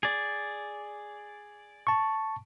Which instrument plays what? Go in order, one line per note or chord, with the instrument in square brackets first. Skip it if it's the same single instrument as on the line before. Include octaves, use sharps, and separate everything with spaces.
[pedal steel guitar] G#4 D5
[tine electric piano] A5 C#6